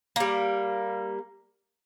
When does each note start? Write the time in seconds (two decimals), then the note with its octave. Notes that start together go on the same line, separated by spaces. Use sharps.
0.16 G3 A#3